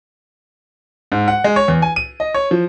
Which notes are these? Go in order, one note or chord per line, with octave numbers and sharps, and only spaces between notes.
G#2
F#5
G#3
C#5
E2
G#5
D#7
D#5
C#5
F3